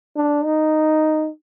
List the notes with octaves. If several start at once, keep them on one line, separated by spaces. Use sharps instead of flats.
D4
D#4